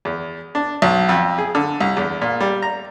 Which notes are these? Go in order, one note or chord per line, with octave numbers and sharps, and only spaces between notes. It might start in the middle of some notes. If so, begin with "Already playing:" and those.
E2
D4
B1
F2
G#4
D3
C2
E2
A#2
G3
A#5